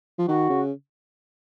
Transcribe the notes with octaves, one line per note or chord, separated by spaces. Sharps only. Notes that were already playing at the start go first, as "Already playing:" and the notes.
F3
D#3 F#4
C#3